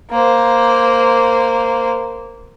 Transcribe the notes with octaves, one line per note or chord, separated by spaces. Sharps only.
A#3 C5